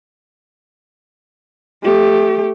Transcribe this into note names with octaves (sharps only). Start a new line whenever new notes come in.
A3 G4